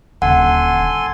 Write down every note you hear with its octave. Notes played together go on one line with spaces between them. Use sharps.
D#1 D3 A4 F#5 G#5 C6